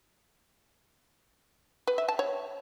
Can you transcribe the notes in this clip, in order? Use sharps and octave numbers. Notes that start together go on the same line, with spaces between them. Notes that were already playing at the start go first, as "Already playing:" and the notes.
B4
E5
A5
C#5